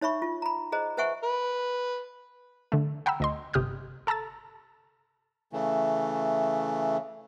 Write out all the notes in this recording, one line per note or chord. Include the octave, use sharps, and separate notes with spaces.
D#4 C#5 E5 B5 C#6
F4
A#5 B5
G#4 C5 D#5 A#5
B4 C5 E5 F#5 G#5 C#6
B4
D3 A3
F#5 G5 A#5 B5 E6
D2 D#5 C6
G1 C3 G4 D#6 F6 G6
A4 A5 A#5 E6 A6
C#3 E3 A3